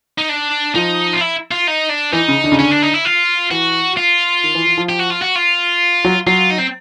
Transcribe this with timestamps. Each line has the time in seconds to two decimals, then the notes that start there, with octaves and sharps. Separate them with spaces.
0.18 D#4
0.29 D4
0.75 F3 D#4
1.13 F4
1.21 E4
1.52 F4
1.68 D#4
1.90 D4
2.12 E3 D#4
2.28 C#3
2.44 D3
2.52 C#3
2.59 D3 C#4
2.71 D4
2.82 D#4
2.94 E4
3.05 F4
3.51 E3 F#4
3.97 F4
4.44 D#3
4.55 E3
4.66 E3
4.78 F3
4.89 G4
5.00 F#4
5.11 F4
5.22 F#4
5.36 F4
6.05 F#3
6.27 F#3 F4
6.51 D#4
6.59 C4